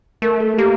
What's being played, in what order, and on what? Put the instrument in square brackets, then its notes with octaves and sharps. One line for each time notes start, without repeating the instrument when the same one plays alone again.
[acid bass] A3 [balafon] A#4
[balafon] A4
[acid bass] A#3 [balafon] G4